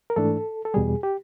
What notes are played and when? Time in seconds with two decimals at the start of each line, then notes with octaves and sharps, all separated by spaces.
0.10 A#4
0.16 G#2 E3 A3 D4 A4
0.65 A4
0.74 E2 B2 G3 G#4
1.03 G4